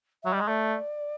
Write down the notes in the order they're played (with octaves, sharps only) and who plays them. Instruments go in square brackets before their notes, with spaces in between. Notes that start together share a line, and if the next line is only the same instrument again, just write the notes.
[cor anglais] F#3 [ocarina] E5
[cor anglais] G3 [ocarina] D#5
[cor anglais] G#3
[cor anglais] A3 [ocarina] D5